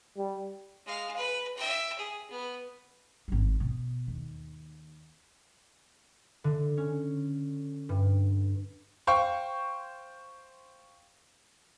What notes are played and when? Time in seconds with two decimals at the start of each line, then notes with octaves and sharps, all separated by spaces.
0.17 G3
0.86 G#3 F5
1.16 B4
1.57 E5 G5
1.99 G#4
2.31 B3
3.28 G#1 G3
3.60 B2
4.07 D#2
6.44 D3
6.77 C#4
7.89 G2
9.07 C5 F5 G5 C#6